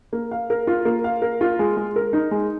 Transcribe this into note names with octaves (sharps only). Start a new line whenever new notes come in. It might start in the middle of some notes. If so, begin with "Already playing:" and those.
A#3
F5
A#4
F4
A#3
F5
A#4
F4
G#3
G#3
A#4
D#4
G#3